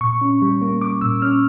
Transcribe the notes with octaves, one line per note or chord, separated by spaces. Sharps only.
A#2 C#6
C#4
G3
A#3
G3 D6
A#2 E6
C#4 F6